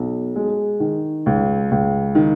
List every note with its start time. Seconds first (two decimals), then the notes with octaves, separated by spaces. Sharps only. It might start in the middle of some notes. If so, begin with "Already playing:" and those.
Already playing: B1
0.36 G#3
0.80 D#3
1.26 C#2
1.71 C#2
2.15 D#3